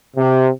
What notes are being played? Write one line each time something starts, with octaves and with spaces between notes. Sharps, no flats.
C3